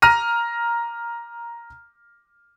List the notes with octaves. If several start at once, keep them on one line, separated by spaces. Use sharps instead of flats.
A#5 F6 A#6 D#7